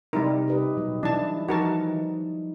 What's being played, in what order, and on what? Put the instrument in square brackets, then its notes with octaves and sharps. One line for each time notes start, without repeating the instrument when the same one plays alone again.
[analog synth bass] C3 [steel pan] G3 E4 A#4 [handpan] D#4
[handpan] G4 B4 D#5
[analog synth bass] B2 [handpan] F#3 G3
[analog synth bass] E3 [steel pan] D4 A5 [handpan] E4
[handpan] F3 D#4 [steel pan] F#4 A#4 A5